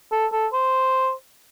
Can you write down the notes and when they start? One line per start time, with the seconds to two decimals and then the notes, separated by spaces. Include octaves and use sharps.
0.12 A4
0.32 A4
0.53 C5